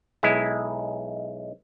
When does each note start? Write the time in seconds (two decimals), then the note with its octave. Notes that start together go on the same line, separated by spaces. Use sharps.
0.23 B1 G#3 E4